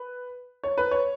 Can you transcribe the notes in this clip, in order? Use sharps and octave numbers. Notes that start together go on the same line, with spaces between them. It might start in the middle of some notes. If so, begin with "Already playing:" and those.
Already playing: B4
C#5
B4
C#5